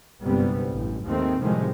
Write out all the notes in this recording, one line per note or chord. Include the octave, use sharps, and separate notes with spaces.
G1 C2 G#2 C3 G3 B3
A1 F#2
D#2 G#2 D#3 A3 C4
A2 C3 D#3 F3 G3 G#3